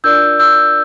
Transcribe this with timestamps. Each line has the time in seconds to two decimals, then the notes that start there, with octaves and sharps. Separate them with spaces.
0.04 D4 F4 A#4 D5 E6 G6
0.39 E6 G6